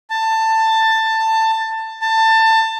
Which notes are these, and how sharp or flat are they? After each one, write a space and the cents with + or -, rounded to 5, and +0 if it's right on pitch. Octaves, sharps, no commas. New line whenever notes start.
A5 +15
A5 +20